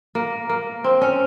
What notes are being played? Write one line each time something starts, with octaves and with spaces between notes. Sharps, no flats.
A#3
A#3
C4
C#4